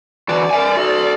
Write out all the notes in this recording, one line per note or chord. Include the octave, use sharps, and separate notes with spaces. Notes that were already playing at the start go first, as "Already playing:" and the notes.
D3 E3 F#4 D5
A#4 E5 G#5
F#4 A4